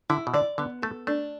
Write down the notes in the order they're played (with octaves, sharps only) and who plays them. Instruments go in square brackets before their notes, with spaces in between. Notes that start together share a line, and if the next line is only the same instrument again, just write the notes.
[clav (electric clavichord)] D3 [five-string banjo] E4
[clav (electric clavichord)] B2
[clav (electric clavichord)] D3 [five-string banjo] D5
[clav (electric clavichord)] D3 [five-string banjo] B3
[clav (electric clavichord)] A3 [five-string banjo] A4
[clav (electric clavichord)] A3 [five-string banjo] D4